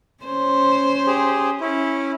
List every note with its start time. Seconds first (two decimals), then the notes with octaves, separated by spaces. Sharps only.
0.24 C#4 C5
1.07 G4 G#4
1.61 C#4 E4